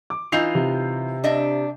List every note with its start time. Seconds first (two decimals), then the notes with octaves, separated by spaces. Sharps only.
0.10 D6
0.32 E3 D#4 F4 G6 C7 F7
0.55 C3
1.24 D4 D#5 E5